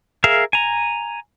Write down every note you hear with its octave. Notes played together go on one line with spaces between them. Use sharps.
G#4 A#4 E5 F5
G#5 A#5